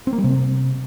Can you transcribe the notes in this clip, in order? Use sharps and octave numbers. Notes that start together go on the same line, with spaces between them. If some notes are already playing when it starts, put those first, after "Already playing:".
C4
A#3
G3
C3